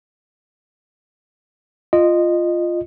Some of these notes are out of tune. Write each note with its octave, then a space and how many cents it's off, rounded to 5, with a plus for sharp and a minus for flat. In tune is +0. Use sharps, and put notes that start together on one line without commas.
F4 -5 D#5 -15